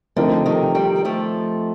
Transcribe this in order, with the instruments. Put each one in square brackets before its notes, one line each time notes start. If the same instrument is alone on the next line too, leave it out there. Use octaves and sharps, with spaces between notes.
[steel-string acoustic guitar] D3 [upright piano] F3 A3 C4 D#4 A#4
[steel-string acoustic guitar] C3 D#3
D#3 G3
F3 A3